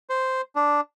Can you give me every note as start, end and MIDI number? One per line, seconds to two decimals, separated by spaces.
0.09 0.41 72
0.56 0.81 62